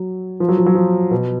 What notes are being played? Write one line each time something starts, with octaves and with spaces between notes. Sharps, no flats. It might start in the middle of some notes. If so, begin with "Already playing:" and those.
Already playing: F#3
F3
F#3
F3
F#3
F3
B2